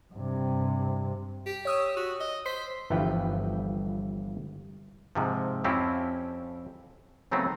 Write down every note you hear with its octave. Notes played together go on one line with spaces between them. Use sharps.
G2 C3
G4
C#5 D#6 E6
F#4
D#5
C5 B6
G1 G2 E3 F3 B4 G5
G#2 C3 F3
F2 F3 C4 C#4 E4 G4
C#3 F#3 A3 B3 C4 D#4